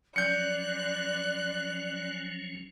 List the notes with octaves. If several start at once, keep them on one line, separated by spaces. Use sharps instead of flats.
F3 F#3 C#4 D5 F#6 G6 C#7